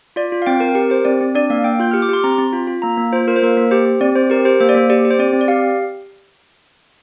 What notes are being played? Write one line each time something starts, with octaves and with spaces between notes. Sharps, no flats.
F4 D5
F4
F5
C4 G5
C4 A#4
G4 A#4
G4 C5
C4 D5
C4
D4 D5
A#3 F5
A#3 G5
F4 G6
G4 F6
D6
G4 C6
C4 A#5
C4
F4
F4
A#3 A#5
A#3
F4 C5
F4 A#4
C5
A#3 A#4
A#3
G4 C5
G4
C4 D5
C4 C5
G4 A#4
G4 C5
A#3 C5
D5
A#3 C5
G4 D5
G4
C5
C4 D5
C4
D5
G4 F5